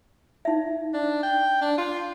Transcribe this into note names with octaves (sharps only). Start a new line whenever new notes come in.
D#4 E5
D4
G5
D4
F4